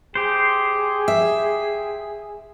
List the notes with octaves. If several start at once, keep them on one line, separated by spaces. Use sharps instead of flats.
G4 G#4 C5
E5